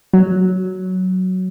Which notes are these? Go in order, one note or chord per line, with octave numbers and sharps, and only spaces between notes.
F#3